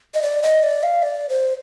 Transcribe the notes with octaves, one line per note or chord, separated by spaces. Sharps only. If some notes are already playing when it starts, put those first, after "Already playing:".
D#5
D5
D#5
D5
F5
D5
C5